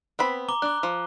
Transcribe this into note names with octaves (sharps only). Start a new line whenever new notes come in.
B3 C4 B5
A#5 D6 G7
D4 D6 F#6
F3